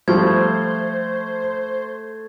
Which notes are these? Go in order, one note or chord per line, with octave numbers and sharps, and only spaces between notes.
F3 G3 A3 C5 G#6